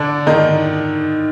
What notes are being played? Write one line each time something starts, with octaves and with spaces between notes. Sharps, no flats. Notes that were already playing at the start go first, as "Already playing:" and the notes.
Already playing: D3 D4
D#3 D#4